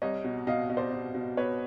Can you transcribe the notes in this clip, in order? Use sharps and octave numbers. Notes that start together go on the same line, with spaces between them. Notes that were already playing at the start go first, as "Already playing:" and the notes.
C2 C#5 D#5
B2
B2 D#5 F5
B2
C5 D5
B2
B2
B2 B4 C#5